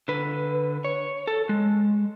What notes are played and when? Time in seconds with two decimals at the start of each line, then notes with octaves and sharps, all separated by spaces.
0.08 D3 B4
0.85 C#5
1.27 A4
1.49 G#3